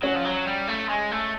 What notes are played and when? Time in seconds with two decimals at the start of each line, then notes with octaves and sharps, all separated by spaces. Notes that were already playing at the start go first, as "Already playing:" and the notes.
0.03 F#3 C#4
0.15 F3
0.25 F#3
0.47 G3
0.68 A3
0.89 G#3
1.12 A3